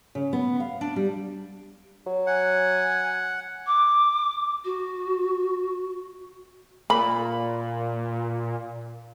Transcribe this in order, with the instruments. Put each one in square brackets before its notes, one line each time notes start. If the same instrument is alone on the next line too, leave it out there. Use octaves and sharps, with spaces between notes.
[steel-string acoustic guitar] C#3
B3
F5
D4
G3
[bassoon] F#3
[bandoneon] F#5 [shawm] G#5
[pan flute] D6
F#4
[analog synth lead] A#2 [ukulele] B5